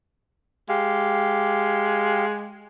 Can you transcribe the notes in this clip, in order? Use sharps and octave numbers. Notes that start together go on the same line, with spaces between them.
G#3 G4 F5